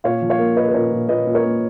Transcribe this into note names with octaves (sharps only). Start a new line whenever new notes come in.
A#2 C#5 F5
F3
C#5 F5
A#3
A#3 B4 D#5
B4
A#2 A#4 C#5
A#2
A#2 B4 D#5
A#2
A#4 C#5
A#3